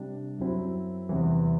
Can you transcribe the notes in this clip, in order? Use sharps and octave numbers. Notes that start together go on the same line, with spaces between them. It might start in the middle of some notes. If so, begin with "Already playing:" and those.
Already playing: C3 G3 D4
F#2 F#3 C4 E4
E2 C3 E3